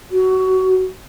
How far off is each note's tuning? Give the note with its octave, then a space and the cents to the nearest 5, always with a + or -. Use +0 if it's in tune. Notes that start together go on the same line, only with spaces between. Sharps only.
F#4 +25